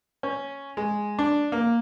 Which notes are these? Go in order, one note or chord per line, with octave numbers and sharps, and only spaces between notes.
C#4
G#3
D4
A#3